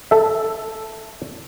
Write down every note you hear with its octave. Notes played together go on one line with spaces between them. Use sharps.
A4 E5